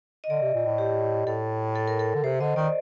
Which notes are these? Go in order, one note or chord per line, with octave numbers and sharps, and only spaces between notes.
D#5
D3 D5
C3
A#2
A2
G4
A2 A4
A4
A#4
A4
D3
C3 C5
D3 D#5
D#3 D5